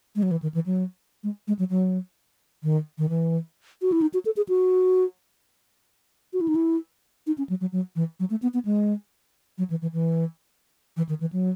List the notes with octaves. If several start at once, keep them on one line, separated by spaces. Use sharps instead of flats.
G#3
F#3
E3
D#3
E3
F#3
G#3
G#3
F#3
F#3
D#3
D#3
E3
F#4
E4
D#4
F#4
A4
G#4
F#4
F#4
E4
D#4
E4
D#4
C#4
F#3
F#3
F#3
E3
F#3
A3
B3
B3
G#3
F#3
E3
E3
E3
E3
D#3
E3
F#3